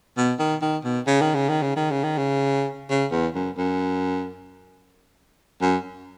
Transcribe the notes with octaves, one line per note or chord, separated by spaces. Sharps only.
B2
D#3
D#3
B2
C#3
D#3
C#3
D#3
C#3
D#3
C#3
D#3
C#3
C#3
E2
F#2
F#2
F#2